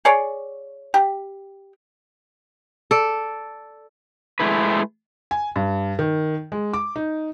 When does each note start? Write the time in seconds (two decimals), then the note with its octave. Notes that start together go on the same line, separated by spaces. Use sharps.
0.05 G#4 C#5 D5
0.94 G4
2.91 A4 D5
4.40 G#3 A3 E4 B4
5.31 G#5
5.56 G2
5.99 D#3
6.52 G#3
6.73 D6
6.96 D#4